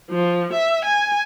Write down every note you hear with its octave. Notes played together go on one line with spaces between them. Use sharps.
F3
E5
G#5